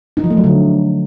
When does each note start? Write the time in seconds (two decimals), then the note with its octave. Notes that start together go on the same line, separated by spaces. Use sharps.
0.17 D#4
0.24 F3
0.30 A3
0.37 F#3
0.44 D3